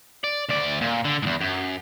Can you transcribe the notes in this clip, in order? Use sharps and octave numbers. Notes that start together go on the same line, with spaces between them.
D5
D2 D5
A#2
D3
E2 G#2
F#2